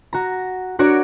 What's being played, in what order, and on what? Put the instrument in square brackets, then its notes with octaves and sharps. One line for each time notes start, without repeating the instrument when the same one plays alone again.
[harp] F#4 A#5
D4 F#4 A#4 C#5 D6